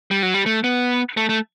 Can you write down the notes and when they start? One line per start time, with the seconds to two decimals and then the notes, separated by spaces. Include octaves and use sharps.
0.11 G3
0.23 F#3
0.34 G3
0.46 A3
0.64 B3
1.17 A3
1.29 A3